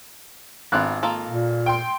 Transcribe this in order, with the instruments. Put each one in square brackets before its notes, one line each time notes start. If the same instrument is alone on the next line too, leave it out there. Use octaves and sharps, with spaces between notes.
[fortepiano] G#1 F#6 [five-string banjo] B3 D4 F4
[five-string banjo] A#3 F4 A4
[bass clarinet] A#2
[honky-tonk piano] G5 C6